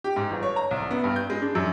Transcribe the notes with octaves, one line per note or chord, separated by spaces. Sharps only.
G4
G#2
G1
C#5
A#5
C2
B3
G2
G6
G#3
D4
F#2